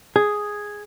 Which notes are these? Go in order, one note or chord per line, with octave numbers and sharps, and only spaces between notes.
G#4